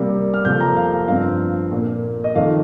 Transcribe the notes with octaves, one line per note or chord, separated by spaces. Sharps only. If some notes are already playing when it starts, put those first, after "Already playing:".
Already playing: C3 G3 A#3
F6
F2 C3 F3 A#3 G6
A#5
F5
F5
G2 F3 C4 F5
A#2 A#3
D#5
F2 D#3 A#3 F5